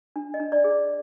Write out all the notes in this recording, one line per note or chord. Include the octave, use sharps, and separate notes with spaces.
D4
D#5
D4
D5
G#4
D5